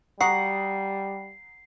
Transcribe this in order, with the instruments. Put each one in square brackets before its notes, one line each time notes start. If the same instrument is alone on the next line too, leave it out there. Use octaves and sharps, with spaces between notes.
[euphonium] G3 [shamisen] F#4 [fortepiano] F#5 A#5 D#6 [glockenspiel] C7